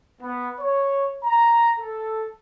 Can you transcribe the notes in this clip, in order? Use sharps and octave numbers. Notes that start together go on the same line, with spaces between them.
B3
C#5
A#5
A4